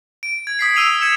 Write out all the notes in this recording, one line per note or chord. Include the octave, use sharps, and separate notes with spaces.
D7
G#6
D#6 B6 C7
E6 D#7 F7
E6 G#6 C#7 E7